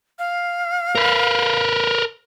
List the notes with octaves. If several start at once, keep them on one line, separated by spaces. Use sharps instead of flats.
F5
A#4 B4